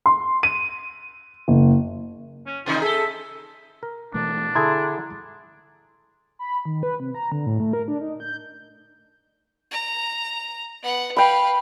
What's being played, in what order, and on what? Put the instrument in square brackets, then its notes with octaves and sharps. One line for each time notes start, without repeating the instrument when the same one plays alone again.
[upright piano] C6
D#7
F#1
[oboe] C#4
[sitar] C3 D#3 D#4 [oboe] F4
[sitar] G#4 A4 [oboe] E5
[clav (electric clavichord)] A#4
[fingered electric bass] B2 E3 A3 [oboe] D4
[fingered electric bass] D3 [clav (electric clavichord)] E4 G#4 A4 [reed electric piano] A#5 C6 G#6
[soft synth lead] B5
D#3
B4
C3
A#5
D3
A2
A3
A#4
D4
D#4
G6
[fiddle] A#5
B3 F#5
[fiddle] B4 F5 [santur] G5 B5